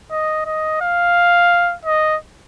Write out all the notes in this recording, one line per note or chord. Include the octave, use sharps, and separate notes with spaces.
D#5
D#5
F5
D#5